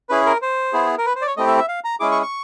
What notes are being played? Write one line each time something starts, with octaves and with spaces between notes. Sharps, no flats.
C#4 E4 G#4 B4
A#4
C5
B3 E4 G#4
A#4
B4
C5
D5
C#5
A3 C4 E4 G4 D#5
E5
E5
F5
A#5
G#3 C#4 E4 G#4 D6
C#6
C#6